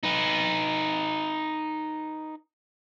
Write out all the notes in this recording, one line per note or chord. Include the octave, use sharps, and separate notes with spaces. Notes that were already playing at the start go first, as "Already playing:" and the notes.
D#4 B4